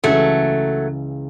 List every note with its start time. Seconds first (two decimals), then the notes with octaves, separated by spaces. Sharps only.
0.04 C#2 C#3 E3 F#3 A3